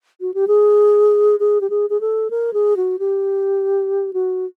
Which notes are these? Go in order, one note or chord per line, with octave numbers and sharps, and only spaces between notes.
F#4
G4
G#4
G#4
G4
G#4
G#4
A4
A#4
G#4
F#4
G4
F#4